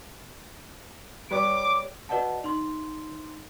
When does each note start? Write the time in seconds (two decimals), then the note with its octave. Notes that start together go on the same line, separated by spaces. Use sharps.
1.31 G3 B4 C#5 D6
2.09 F#4 B4 D5 D#5 F#5 A5
2.44 D#4 C6